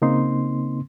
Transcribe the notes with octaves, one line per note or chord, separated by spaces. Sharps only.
C#3 A#3 C4 D#4 C6